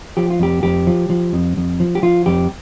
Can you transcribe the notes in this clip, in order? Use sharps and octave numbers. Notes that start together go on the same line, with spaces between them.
F3 G4
F4
F2 G4
F2 G4
F3
F3
F2
F2
F3
G4
F3 F4
F2 G4